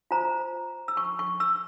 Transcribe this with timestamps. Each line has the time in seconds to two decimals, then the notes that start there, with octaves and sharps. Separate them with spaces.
0.11 F4 C5 A#5
0.88 E6
0.97 C#6
1.19 C#6
1.40 E6